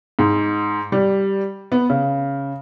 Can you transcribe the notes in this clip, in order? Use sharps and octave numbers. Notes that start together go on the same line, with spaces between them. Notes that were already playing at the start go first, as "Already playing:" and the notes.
G#2
G3
B3
C#3